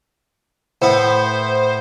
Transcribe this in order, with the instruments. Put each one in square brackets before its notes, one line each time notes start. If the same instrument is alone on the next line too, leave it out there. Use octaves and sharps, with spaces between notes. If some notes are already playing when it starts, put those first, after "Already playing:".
[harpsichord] A2 B3 [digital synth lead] C5